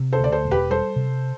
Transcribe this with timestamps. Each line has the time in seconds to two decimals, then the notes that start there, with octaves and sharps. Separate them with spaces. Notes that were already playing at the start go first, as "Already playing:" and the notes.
Already playing: C3
0.13 A4 C5
0.19 D2 D5
0.32 A4 C5
0.45 E1
0.51 G4 B4
0.70 G3 A4 C5
0.96 C3